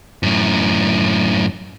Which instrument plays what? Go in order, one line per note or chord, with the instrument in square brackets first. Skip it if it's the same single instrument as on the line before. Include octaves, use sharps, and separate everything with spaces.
[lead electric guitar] F#2 A2